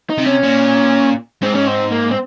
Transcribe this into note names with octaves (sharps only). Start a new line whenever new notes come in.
D#4
C3
C#4
A#2
G#2 C4
C#4
C4
A#3
C4